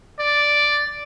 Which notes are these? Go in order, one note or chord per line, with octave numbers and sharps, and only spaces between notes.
D5